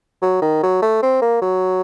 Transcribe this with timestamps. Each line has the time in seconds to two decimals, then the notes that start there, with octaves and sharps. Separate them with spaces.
0.22 F#3
0.42 D#3
0.63 F#3
0.82 A3
1.02 C4
1.21 A#3
1.41 F#3